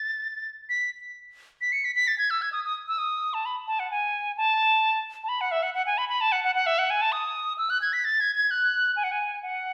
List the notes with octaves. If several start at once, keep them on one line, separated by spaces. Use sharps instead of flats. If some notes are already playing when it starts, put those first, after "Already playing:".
Already playing: A6
B6
B6
C#7
B6
B6
A6
G#6
E6
G#6
D#6
D#6
E6
D#6
A5
B5
A5
F#5
G#5
A5
A5
B5
F#5
E5
F#5
F#5
G#5
B5
B5
A5
F#5
F#5
F#5
E5
F#5
G#5
A5
D#6
E6
F#6
G#6
B6
A6
G#6
G#6
F#6
G#5
F#5
G#5
F#5